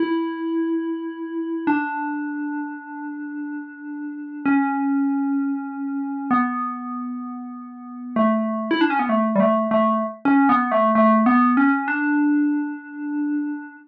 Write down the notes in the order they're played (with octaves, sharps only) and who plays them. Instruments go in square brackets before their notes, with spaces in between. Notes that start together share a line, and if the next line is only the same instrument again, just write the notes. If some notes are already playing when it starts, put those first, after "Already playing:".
Already playing: [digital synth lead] E4
D4
C#4
B3
A3
E4
D4
C#4
B3
A3
G3
A3
A3
C#4
B3
A3
A3
B3
C#4
D4